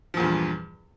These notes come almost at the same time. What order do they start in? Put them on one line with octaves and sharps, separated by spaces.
F3 A#2 E2 G2